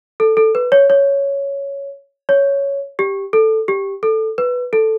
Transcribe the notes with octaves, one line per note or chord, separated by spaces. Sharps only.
A4
A4
B4
C#5
C#5
C#5
G4
A4
G4
A4
B4
A4